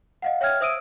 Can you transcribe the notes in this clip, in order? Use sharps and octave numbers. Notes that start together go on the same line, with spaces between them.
D#5 F5 F#5
C#5 E5 G5 F6 G#6
C5 E5 D#6 E6 D7 D#7